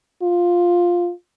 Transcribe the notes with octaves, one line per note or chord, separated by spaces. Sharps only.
F4